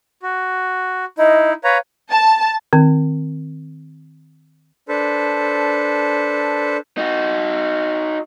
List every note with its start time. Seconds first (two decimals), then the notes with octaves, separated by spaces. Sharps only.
0.23 F#4
1.18 D#4 E4 D#5
1.64 B4 C#5 F5 A#5
2.10 A5
2.73 D#3 C4
4.88 D4 A4 B4 C5
6.98 D#4 F#4